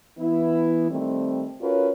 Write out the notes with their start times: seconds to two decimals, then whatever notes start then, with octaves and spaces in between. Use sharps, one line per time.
0.18 E3 B3 E4
0.90 D#3 G3 A3 C4
1.61 C#4 F4 F#4 A#4 B4 C#5